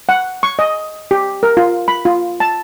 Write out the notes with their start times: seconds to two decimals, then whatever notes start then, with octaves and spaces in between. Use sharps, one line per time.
0.09 F#5
0.43 C#6
0.59 D#5
1.11 G4
1.43 A#4
1.57 F4
1.88 B5
2.05 F4
2.40 A5